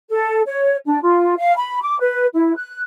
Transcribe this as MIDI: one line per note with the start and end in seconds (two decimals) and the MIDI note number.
0.10 0.42 69
0.46 0.77 73
0.86 1.01 62
1.02 1.34 65
1.37 1.54 77
1.56 1.81 83
1.82 1.97 86
2.00 2.26 71
2.34 2.55 64
2.56 2.83 90